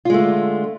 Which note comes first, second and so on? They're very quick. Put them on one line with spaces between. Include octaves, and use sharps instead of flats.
F4 G#3 A3 D3